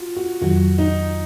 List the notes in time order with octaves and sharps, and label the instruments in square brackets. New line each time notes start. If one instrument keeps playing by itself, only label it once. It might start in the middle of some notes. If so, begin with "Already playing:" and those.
Already playing: [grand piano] F4 F#4
F#4
[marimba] F2 D#3 F#3 [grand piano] F#4
[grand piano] D#4